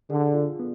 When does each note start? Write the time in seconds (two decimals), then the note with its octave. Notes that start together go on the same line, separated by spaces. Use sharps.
0.10 D3 G#4
0.34 F4
0.59 B3